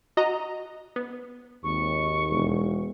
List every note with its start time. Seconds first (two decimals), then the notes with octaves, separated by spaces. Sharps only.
0.17 F#4 D#5 A#5
0.96 B3
1.64 G#1 D#2 C#6
2.30 E1